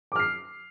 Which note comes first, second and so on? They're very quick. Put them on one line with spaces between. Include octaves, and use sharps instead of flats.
D6 F6 C7